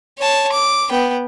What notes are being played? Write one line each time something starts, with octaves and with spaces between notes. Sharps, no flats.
C#5 A5
D6
B3 G5